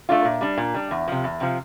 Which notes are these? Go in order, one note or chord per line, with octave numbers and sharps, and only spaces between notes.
A3 D4 F4
A#2
G3 D4
A#2
G3 D4
E2
C3 F3
E2
C3 F3